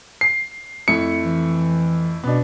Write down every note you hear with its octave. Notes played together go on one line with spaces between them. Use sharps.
C7
F2 A3 E4 C#7
E3
B2 B3 D4